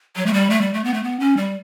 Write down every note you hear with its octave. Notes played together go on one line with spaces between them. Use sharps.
F#3
A3
G3
A3
G3
A3
B3
A3
B3
C#4
G3